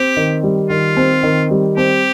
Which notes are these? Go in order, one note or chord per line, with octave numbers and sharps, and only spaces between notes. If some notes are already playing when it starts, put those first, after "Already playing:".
Already playing: C4 G4
D#3
G3
D#3 F4
C4
D#3
G3
C4 G4